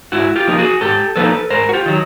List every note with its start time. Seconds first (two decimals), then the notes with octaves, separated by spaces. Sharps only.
0.12 G#2 E4 F#4
0.36 F4 G4
0.47 F3 A#3 D#4
0.59 F#4 G#4
0.81 G#2 G4 A4
1.16 F3 A#3 D#4 A4 B4
1.50 G#2 A#4 C5
1.69 F#4
1.73 F4 G4
1.86 D#3 F#3